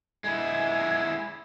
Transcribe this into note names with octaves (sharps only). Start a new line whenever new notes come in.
G#3 E4